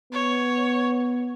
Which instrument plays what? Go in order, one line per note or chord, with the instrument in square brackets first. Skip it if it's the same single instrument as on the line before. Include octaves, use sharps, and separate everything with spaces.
[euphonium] B3 [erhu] C#5